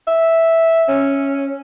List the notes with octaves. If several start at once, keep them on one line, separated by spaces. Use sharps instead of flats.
E5
C#4